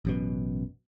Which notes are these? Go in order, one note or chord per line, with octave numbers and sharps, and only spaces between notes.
A1 F#2 B2